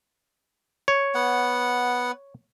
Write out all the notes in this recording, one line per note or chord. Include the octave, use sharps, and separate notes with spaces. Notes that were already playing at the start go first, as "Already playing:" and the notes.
C#5
B3 F#5